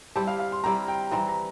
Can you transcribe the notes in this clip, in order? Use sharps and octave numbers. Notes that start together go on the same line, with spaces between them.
G3 C4 E4 G4 A5
F5
F5
C6
G3 C4 E4 G4 A#5
G5
E3 G3 C4 A#5
A#5